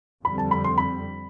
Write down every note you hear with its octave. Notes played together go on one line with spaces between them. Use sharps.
F2 D3 G3 C4 B5
A5
B5
C6
B5